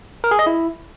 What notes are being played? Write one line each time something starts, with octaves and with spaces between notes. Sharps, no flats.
A#4
G#4
D#5
E4